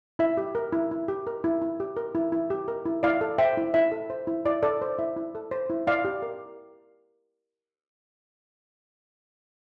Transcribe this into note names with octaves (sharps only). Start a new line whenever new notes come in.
E4 E5
G4
A#4
E4
E4
G4
A#4
E4
E4
G4
A#4
E4
E4
G4
A#4
E4
E4 D5 F5
A4
C5 E5 G5
E4
E4 E5
A4
C5
E4
E4 D5
A4 D5
C5
E4 E5
E4
A4
C5
E4
E4 D5 F5
G4
A#4